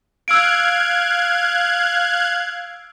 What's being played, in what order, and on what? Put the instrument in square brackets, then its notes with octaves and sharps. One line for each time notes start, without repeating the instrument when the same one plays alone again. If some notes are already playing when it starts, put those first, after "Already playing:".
[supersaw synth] F5 F#6 G#6 [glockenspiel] E6 D7